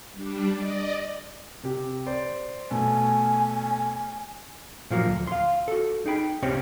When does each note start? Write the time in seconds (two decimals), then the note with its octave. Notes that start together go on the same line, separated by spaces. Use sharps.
0.13 G3 D4
0.54 D5 D#5
1.63 C3 G4
2.06 C5 D5 C6
2.71 B2 A3 G#5
4.90 A#2 F3 F#3 A#3
5.06 D2
5.27 F5 C6
5.68 F#4 A4
6.06 D#4 G#4 G5 B5
6.42 C#2 C3 C4 C#4 G4 C#5